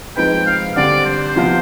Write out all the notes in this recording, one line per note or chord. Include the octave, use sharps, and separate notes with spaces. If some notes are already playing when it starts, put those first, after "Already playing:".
F3 G#3 C4 D#4 B4 G5
F5
D3 G3 C4 D5
C5
C3 F3 B3 F4